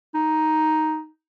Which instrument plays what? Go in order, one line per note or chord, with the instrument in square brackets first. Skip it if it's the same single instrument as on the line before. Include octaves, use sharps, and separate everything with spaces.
[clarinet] D#4